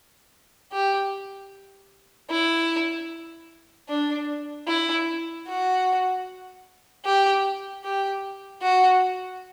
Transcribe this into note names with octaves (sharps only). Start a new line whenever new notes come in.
G4
E4
D4
E4
F#4
G4
G4
F#4